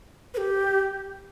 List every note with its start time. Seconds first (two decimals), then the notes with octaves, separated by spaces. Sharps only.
0.34 B4
0.38 G4